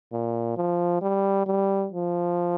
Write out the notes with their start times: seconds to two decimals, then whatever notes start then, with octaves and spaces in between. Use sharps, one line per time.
0.12 A#2
0.57 F3
1.02 G3
1.46 G3
1.92 F3